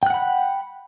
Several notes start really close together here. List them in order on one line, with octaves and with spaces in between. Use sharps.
G5 F#6 F#5 B5